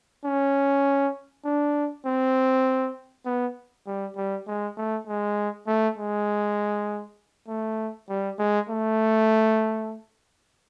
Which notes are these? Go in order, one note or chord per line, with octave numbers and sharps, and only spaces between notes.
C#4
D4
C4
B3
G3
G3
G#3
A3
G#3
A3
G#3
A3
G3
G#3
A3